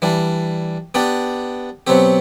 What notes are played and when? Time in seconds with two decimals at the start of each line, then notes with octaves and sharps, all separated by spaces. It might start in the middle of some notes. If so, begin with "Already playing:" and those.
0.02 E3 G3 D4
0.94 B3 D4 G4 D5
1.87 B2 F#3 C4 G4